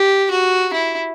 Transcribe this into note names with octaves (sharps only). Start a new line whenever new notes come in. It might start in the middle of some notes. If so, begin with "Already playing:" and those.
Already playing: G4
F#4
E4